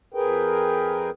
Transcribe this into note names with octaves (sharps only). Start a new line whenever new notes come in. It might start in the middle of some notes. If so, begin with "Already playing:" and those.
F2 G#4 A#4 B4 G5